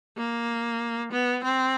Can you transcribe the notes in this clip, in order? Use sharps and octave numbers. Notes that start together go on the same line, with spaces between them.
A#3
B3
C4